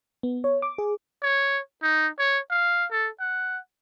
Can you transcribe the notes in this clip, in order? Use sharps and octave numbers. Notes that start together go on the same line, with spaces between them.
B3
C#5
D6
G#4
C#5
D#4
C#5
F5
A4
F#5